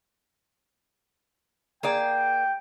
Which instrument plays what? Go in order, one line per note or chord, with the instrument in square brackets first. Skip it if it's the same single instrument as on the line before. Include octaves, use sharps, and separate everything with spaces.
[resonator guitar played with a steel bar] A#3 G#4 D5 [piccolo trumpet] G5